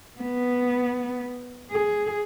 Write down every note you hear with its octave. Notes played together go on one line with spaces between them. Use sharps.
B3
G#4